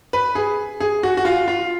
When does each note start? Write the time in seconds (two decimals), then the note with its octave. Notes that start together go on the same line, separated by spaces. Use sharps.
0.13 B4
0.35 G#4
0.80 G#4
1.03 F#4
1.17 F#4
1.25 F4
1.48 F4